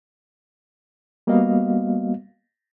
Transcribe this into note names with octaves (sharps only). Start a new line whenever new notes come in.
G3 A#3 B3 F#4 D#5 F5